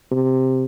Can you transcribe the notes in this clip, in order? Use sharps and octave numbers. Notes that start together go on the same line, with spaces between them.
C3